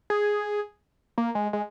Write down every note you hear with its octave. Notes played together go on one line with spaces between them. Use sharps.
G#4
A#3
G#3
G#3